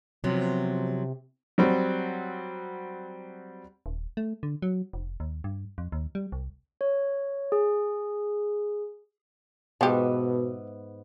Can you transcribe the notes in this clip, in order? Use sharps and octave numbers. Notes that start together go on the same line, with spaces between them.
C3 F3 F#3 B3
F#3 G3 C4
D#1
A3
D3
F#3
F1
D#2
G2
F2
D#2
G3
C2
C#5
G#4
G#2 B2 F3 B3 G4 E5